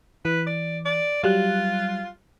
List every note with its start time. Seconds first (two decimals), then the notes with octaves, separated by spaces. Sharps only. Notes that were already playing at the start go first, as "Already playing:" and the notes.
0.25 E3 B4
0.47 D5
0.85 D5
1.23 F#3 G3 F4 F#6